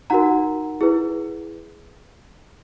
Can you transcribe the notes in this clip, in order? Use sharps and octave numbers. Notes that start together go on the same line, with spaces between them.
D#4 F#4 A#4 F#5 A#5
E4 G#4 B4